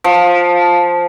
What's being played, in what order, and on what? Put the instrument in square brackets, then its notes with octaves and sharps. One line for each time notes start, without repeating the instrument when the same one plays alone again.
[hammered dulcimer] F3